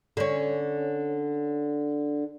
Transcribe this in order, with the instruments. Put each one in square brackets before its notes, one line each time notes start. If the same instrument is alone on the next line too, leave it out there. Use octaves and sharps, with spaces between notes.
[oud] D3 C#4